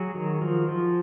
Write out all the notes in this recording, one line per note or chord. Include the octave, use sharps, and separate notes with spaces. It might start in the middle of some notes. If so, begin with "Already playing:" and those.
Already playing: F#3 F#4 G#4
D#3
F3
F3